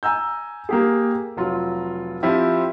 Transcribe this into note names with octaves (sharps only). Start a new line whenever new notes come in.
G#5 A#5 E6 G6
A#3 G4 G#4
F1 F#3 F4
F3 C4 E4 G4